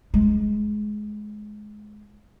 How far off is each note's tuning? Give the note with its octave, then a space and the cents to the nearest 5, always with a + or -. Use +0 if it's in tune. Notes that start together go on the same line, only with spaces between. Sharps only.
G#3 +20